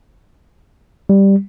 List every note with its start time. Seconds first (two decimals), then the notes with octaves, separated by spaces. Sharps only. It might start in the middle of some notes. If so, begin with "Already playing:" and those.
1.09 G3